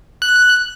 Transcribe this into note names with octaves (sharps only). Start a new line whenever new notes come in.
F#6